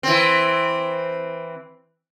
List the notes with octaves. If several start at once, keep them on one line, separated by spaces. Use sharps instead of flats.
E3 C4